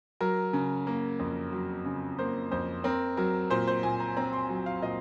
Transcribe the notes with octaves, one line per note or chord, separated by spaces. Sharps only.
F#3 A#4
C#3
A#3
F2
F#3
C#3
A#3 C5
F2 C5
C4 A#4
F#3 A#4
A#2 C5
C5
A#2 G#5
A#5
C4 A#5
C6
F#3
F5
A#2 D#5